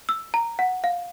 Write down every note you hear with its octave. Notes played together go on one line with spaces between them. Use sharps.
E6
A#5
F#5
F5